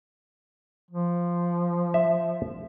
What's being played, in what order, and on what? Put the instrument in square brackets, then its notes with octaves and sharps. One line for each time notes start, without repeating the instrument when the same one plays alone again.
[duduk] F3
[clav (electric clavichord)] E5